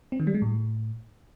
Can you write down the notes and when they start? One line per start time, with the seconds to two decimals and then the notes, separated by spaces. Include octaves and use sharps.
0.12 C4
0.20 D#3
0.27 G3
0.35 G#3
0.42 A2